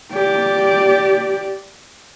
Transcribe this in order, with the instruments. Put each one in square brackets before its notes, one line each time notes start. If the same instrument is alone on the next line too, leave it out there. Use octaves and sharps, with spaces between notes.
[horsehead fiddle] G4 D5